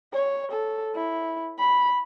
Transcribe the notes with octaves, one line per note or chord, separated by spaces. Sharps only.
C#5
A4
E4
B5